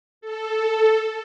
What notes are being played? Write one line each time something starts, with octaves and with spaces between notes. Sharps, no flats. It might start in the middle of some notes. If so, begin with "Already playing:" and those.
A4